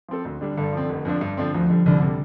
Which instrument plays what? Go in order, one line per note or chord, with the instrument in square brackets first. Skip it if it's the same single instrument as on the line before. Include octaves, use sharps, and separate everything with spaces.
[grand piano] F3 C4 A4
D2
D3 G3 D4
[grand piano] G2 [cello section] D3
[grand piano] F3 C4
F1
F2 D3 F3 D4
G2
D3 F3 C4
[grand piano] D2 [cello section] F3
[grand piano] D3 G3
[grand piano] C2 [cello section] D3
[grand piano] C3 G3